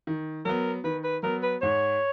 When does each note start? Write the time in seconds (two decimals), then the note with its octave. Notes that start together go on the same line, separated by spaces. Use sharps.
0.07 D#3
0.45 F#3 B3 A#4
0.84 D#3 B4
1.04 B4
1.23 F#3 B3 A#4
1.43 B4
1.62 G#2 C#5